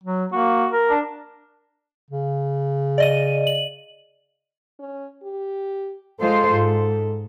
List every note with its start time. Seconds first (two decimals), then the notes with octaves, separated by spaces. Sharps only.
0.03 F#3
0.32 A#3 F#4
0.72 A#4
0.90 D4
2.11 C#3
2.98 D5 D#5 D#7
3.47 F#7
4.79 C#4
5.23 G4
6.20 G#3 F4 A4 C5
6.51 G#2